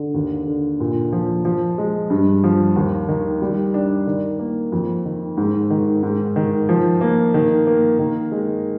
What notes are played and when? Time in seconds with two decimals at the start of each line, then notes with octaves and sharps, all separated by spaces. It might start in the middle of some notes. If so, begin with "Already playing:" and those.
Already playing: D3
0.14 D#2
0.47 D3
0.80 A#2
1.12 F3
1.45 F3
1.78 G#3
2.10 G2
2.44 F3
2.76 D#2
3.09 D#3
3.42 G3
3.74 D4
4.07 D#3
4.39 A#3
4.72 F2
5.05 D#3
5.37 G#2
5.70 D#3
6.03 G#2
6.36 D#3
6.69 F3
7.01 A#3
7.34 D#3
7.67 A#3
7.99 D#3
8.32 G#3